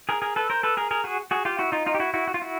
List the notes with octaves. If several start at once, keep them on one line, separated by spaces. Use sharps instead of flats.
G#4 A#4
G#4 A#4
A4 B4
A#4 C5
A4 B4
G#4 A#4
G#4 A#4
F#4 G#4
F#4 G#4
F4 G4
E4 F#4
D#4 F4
D#4 F4
G4
E4 F#4
E4 F#4
F#4
F4
E4 F#4